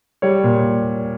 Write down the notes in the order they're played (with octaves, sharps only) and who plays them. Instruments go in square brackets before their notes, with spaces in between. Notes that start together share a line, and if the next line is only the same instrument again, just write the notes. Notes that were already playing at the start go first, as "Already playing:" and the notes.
[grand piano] G3 C#5
A#2